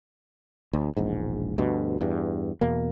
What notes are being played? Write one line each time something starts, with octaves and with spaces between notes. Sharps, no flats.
D2
E1 A#1 G#2
D2 G2 B2
E2 G2
E2 B2 A#3